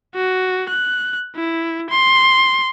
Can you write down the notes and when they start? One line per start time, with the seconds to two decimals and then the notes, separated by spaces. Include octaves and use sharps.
0.14 F#4
0.69 F#6
1.35 E4
1.90 C6